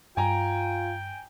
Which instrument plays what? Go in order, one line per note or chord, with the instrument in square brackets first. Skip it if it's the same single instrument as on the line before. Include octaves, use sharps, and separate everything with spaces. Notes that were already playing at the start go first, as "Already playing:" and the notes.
[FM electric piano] G2 [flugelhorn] F4 [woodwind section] G5 [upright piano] G#5 A#5